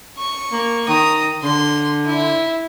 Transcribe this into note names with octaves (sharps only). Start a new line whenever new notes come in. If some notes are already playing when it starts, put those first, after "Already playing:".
C#6
A#3
D#3 A#5 D#6
D3 C6
E4